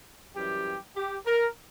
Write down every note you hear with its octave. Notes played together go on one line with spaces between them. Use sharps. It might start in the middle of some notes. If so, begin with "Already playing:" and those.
F#2 E3 G3 G4
G4
A#4